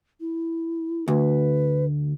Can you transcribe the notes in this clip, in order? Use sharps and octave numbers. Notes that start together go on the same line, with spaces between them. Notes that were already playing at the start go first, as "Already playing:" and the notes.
E4
D2 B4